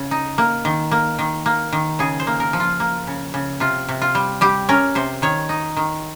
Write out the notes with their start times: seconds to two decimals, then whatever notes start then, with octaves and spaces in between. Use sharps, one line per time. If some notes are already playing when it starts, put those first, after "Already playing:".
Already playing: C#3
0.11 D#4
0.38 A#3
0.65 D#3
0.91 A#3
1.19 D#3
1.46 A#3
1.73 D#3
1.99 C#3 G#4
2.20 C5
2.27 A#3
2.40 A#4
2.53 F3
2.60 F4
2.80 A#3
3.07 C#3
3.34 C#3
3.60 C3 F4
3.89 C3
4.02 F4
4.15 G3
4.41 G3 G4
4.69 C#4 A#4
4.95 C3 C5
5.22 D#3 C#5
5.49 D#4
5.77 D#3